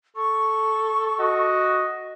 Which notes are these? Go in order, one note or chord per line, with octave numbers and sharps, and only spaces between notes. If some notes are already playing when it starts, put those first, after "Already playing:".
A4 C#6
F#4 D#5